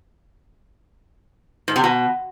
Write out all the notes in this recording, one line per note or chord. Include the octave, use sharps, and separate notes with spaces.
G#2
C3
B2